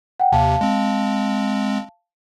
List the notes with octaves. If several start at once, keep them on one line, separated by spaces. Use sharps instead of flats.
F#5 G5
D#2 C3 F5 A5
G#3 C4